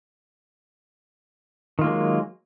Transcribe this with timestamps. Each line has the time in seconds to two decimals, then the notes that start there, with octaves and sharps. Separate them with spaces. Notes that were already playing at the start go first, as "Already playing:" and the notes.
1.79 D#3
1.81 F4
1.84 A#3
1.87 G#3
1.89 F#3